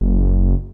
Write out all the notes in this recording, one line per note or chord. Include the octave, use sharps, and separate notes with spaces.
F#1